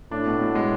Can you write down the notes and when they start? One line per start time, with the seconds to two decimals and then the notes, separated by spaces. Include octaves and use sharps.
0.12 A2 D4
0.27 B2
0.41 B2
0.55 G#3